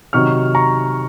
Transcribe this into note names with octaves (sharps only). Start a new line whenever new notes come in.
C3 D#3 F#3 C#6 F6
A#5 C#6